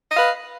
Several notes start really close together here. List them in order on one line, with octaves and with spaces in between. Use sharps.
D#5 F5 B4